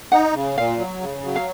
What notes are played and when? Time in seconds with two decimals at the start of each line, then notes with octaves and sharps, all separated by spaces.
0.12 D#4 F#5
0.34 C#3
0.57 A#2 F5
0.79 F#3
1.01 C#3
1.25 F#3
1.36 F5